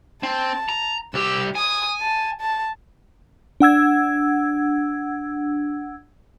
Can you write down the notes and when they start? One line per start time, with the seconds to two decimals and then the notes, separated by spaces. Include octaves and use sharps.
0.23 C4 A5
0.69 A#5
1.14 C2 G4 E6
1.55 G#5 D#6
2.01 A5
2.41 A5
3.60 D4 F#5 E6 G#6